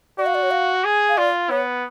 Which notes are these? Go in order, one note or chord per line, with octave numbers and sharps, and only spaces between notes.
F#4 D5
F5
D5
C#5
F5
G#4
F5
F4 D5
B3 C#5